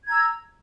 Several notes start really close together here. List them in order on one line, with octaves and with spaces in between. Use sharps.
G#6 A#5 E6